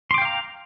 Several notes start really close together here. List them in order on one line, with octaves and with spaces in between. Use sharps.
C6 D6 G5 F5 A#5